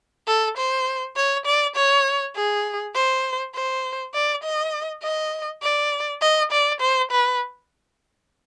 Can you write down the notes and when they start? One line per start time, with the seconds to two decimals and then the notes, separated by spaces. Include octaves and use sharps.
0.27 A4
0.57 C5
1.16 C#5
1.46 D5
1.76 C#5
2.36 G#4
2.95 C5
3.55 C5
4.14 D5
4.43 D#5
5.03 D#5
5.62 D5
6.22 D#5
6.51 D5
6.81 C5
7.11 B4